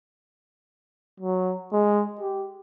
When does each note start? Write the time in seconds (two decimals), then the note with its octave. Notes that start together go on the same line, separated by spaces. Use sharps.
1.20 F#3
1.73 G#3
2.21 G4